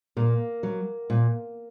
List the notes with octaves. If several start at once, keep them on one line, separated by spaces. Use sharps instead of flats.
A#2 A#3
F#3
A#2